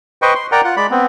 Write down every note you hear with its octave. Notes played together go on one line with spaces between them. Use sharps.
B4 C5 D#5 G5 C#6
C6
A#4 D5 F#5 G5 A#5
F4 F#5
G#3 D5 B5
B3 C4